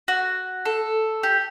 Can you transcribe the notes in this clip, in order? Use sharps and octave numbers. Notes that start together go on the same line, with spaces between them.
F#4
A4
G4